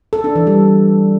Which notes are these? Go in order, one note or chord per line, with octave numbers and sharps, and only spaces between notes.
A4
D4
E3
G3